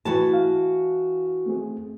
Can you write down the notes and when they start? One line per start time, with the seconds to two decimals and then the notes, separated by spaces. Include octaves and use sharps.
0.05 E3 A3 F#4 A5
0.33 F5
1.46 A3 C4 G#4